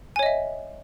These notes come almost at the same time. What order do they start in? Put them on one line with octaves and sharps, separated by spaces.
G#5 C#5 D#5 E5